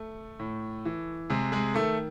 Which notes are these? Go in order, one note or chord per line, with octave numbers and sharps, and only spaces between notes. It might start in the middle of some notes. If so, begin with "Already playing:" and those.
Already playing: A3 A4
A2
E3
C3 G#3 G#4
G#3 G#4
D#3 A3 A4